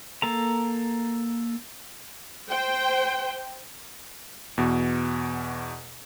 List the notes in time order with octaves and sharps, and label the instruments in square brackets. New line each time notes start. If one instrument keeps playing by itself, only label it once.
[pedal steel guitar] A#3 A4 A#5
[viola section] C5 G5
[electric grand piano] E2 B2